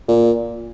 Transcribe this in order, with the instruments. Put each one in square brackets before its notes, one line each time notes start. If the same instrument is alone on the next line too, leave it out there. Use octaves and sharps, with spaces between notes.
[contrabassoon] A#2